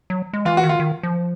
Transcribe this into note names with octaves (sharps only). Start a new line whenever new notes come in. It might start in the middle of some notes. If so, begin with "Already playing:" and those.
F#3
G#3
E3 F4
F#4
D#3
F4
D#3
F3